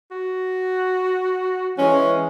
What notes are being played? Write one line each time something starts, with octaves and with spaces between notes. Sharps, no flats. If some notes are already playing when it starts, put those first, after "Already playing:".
F#4
E3 G#3 C#4